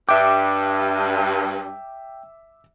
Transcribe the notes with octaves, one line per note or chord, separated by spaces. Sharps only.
G2 E5 G5 D6